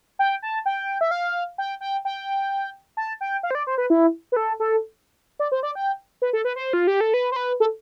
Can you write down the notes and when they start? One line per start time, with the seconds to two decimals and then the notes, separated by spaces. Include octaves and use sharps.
0.19 G5
0.42 A5
0.66 G5
1.01 E5
1.11 F5
1.58 G5
1.81 G5
2.05 G5
2.97 A5
3.21 G5
3.43 F5
3.51 C5
3.55 D5
3.67 C5
3.78 B4
3.90 E4
4.32 B4
4.37 A4
4.60 A4
5.40 D5
5.52 C5
5.63 D5
5.75 G5
6.22 B4
6.33 A4
6.45 B4
6.56 C5
6.73 F4
6.87 G4
7.01 A4
7.14 B4
7.32 C5
7.36 B4
7.60 A4